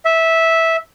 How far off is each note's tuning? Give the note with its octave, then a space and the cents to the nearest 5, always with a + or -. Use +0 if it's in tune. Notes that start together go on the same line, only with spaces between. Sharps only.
E5 -10